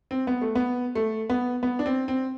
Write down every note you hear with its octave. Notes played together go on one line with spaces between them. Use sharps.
C4
B3
A3
B3
A3
B3
B3
D4
C4
C4